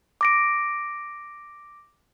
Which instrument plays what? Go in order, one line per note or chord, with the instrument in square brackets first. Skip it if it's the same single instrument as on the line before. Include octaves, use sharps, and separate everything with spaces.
[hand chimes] D6 A#6 D7